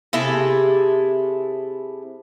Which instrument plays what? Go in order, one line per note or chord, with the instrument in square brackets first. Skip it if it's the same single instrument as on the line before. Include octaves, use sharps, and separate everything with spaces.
[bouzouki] C3 E4 G#4 A4